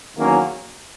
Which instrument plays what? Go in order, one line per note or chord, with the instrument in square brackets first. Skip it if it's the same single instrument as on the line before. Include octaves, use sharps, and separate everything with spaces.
[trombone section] E2 D#3 F#3 A#3 C#4